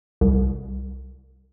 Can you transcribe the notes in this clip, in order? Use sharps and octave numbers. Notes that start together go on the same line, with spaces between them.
C2